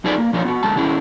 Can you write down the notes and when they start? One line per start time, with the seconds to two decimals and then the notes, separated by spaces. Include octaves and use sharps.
0.04 F#3 D#4 F4 G#4 B4 D5
0.18 A#3
0.33 F3 D4 F4 B4 C#5
0.45 B3 F4 F#4
0.63 D3 G#3 A5
0.76 D#3 C#4 E4 G#4